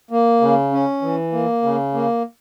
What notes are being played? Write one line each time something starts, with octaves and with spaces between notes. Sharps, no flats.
A#3
C#3
C#4
E3
A#3
C#3
A#3